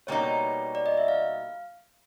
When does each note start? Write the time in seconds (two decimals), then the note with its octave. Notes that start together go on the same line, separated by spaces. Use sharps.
0.07 B2 G3 A#3 D#4 C#5
0.75 D5
0.86 D#5
0.97 E5
1.08 F5